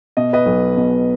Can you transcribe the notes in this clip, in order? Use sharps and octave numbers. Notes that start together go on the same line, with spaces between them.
B2 D#5
B4 D#5
B1
B2